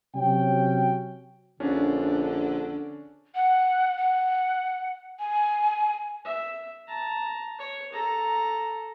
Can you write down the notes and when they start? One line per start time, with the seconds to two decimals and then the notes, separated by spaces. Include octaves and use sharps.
0.15 C3 F#3 C#4 G5
1.60 A#1 D3 C#4 D4
3.35 F#5
3.97 F#5
5.19 G#5
6.25 E5
6.87 A5 A#5
7.59 C#5
7.93 A4 A#5